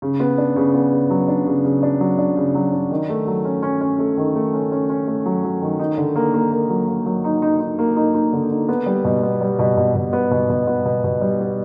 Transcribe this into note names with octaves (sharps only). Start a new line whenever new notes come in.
C#3
B3
D4
C#3
B3
C#3
F#3
D4
C#3
C#3
D4
F#3
D4
C#3
F#3
D4
D#3
A3
F#3
C#4
C#4
C#4
A3
D#3
A3
C#4
C#4
C#4
A3
F#3
F#3
D#3
D#4
D3
A#3
A#3
A#3
F#3
A#3
F#3
D#4
D#4
D#4
A#3
D#4
D#4
D3
D#4
B3
G3
B2
B3
G3
B2
B2
B2
B3
B2
B2
B3
B2
B2
G3
B3